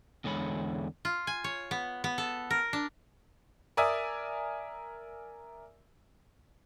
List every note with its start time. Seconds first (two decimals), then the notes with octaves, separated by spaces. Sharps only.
0.24 E2 D3 G#3 C#5 B5
1.05 F4
1.27 G#5
1.44 C#5
1.71 B3
2.04 B3
2.18 A4
2.50 A#4
2.73 D4
3.77 A#4 D5 E5 G#5 D#6 E6